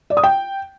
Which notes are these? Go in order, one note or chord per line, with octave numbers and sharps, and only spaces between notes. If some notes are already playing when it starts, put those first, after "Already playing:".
D5
D#6
G5